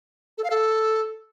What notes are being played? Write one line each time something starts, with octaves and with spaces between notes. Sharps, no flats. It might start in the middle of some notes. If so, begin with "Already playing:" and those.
A4
F5
A4